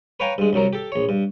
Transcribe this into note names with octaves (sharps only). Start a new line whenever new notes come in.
B4 C#5 F5 G5 G#5 A#5
G2 G#3
C2 F#2 F#3 A#4
G4 A4
A#1 C#5
G2